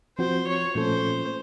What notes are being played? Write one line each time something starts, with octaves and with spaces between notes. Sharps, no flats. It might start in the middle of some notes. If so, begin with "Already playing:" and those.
F3 C4 F#4 C5
C#5
A#2 F3 A3 C#4 A4 C5